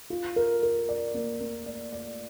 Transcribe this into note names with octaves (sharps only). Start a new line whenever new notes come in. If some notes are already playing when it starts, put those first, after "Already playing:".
F4
A#4
A#4
D5
A#3
A#3
D5
D5